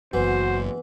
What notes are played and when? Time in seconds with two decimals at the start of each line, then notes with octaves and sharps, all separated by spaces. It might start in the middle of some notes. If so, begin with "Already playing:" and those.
0.13 F#1 F#2 E3 B3 F#4 C5